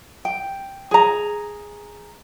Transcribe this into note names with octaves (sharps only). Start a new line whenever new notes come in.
G5
G#4 A#5